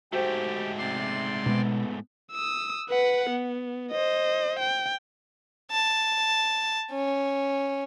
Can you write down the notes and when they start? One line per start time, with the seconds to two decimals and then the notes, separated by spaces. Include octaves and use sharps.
0.12 G#2 A3 F#4 G4 C5 G5
0.79 C3 D5 C6
1.46 B2 G#3 B3
2.32 D#6 E6
2.89 B4 F#5
3.30 B3
3.91 C5 D#5
4.60 G5
5.72 A5
6.91 C#4